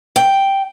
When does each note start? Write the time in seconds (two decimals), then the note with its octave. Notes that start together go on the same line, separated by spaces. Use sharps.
0.16 G5